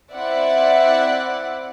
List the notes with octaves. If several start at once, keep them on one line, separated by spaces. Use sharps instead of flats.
C4 E4 D5 E5 F#5